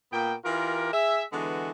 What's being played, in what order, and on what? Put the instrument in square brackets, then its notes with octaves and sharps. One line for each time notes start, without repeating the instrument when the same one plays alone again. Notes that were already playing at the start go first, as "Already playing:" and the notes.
[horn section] A#2 A#3 B3 G5
E3 F4 G4 A#4
G#4 E5
D3 E3 G#3 B3 F#4